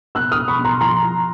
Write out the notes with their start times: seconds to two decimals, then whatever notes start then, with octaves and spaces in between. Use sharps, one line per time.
0.15 B2 E6 F#6
0.32 D#6 F6
0.37 B2
0.48 B5 C#6
0.59 B2
0.64 A#5 C6
0.81 F3 A#5 C6
1.03 F3